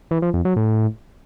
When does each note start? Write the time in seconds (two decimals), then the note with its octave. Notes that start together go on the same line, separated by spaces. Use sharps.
0.11 E3
0.22 F3
0.34 F2
0.45 F#3
0.56 A2